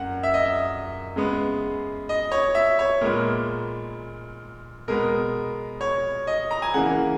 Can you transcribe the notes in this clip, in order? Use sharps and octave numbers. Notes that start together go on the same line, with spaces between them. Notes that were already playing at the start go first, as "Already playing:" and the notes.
Already playing: F#2 A#3 F#5
E5
D#5
E5
C#3 G#3 B3
D#5
C#5
E5
C#5
A#2 G#3 B3 A#4
B2 G#3 B3 A#4
C#5
D#5
A#5
G#5
C#3 E3 A#3 F#5